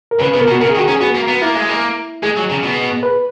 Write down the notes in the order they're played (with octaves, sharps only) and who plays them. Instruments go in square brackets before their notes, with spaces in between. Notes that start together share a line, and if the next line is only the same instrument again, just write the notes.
[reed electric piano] A#4
[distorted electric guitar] C#3 [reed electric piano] B4
[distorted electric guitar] B2 [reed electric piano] B4
[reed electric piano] A#4
[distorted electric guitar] B2
[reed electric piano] F#4
[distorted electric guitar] C#3 [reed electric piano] A#4
[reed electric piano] G#4
[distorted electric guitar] D#3
[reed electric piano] F#4
[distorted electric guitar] C#4 [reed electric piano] G#4
[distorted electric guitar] B3 [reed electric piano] F#4
[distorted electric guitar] A#3
B3
[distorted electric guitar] A#3 [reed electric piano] E4
[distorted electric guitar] G#3
A#3
[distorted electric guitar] G#3 [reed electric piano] G#4
[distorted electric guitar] F#3
C#3
B2
[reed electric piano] B4